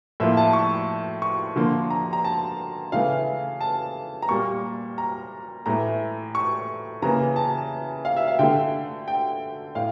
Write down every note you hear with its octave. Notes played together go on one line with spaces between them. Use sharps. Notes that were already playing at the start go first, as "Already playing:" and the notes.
A2 F3 A#3 E5
A5
C#6
C#6
D3 F3 A#3
A#5
A#5
A5
C#3 E3 A3 F5
A5
A#5
A#2 G3 A#3 C#6
A#5
A2 E3 A3 A#5
C#6
C#3 E3 A#3 A#5
A5
F5
E5
F5
D3 A3 G5
G5
A2 F5